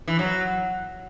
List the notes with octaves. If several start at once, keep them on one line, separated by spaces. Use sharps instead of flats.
E3
F#3